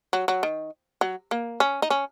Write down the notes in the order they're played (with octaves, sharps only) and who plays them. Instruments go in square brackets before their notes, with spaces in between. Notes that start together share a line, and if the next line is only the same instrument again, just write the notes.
[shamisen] F#3
F#3
D#3
F#3
A#3
C#4
D#4
C#4